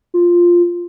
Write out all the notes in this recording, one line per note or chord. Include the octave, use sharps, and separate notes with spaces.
F4